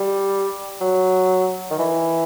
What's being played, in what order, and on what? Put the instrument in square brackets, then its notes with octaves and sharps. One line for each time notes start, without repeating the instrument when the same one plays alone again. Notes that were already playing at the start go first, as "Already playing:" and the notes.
Already playing: [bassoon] G3
F#3
D#3
E3